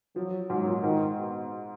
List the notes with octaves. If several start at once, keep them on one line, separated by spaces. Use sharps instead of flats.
F3 F#3
G#2 F#3
A#2
G#2 D#3
B2